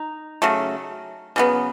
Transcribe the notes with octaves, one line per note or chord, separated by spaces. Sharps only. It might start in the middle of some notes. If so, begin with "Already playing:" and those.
Already playing: D#4
C#3 F#3 A3
C#3 F#3 B3